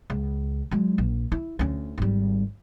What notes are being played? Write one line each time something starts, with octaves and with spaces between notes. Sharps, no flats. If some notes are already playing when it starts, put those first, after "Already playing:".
C#2
F#3 G#3
A#1
E4
D2 C#4
G#1 G3